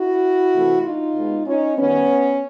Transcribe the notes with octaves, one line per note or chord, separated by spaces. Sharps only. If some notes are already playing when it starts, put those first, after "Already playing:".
Already playing: E4 F#4
C3 E3 A3
D#4 F4
B2 G#3 B3
C#4 D#4
F#2 D#3 G3 B3 C#4